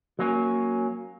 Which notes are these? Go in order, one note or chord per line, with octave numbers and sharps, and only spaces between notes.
F#3 A#3 C#4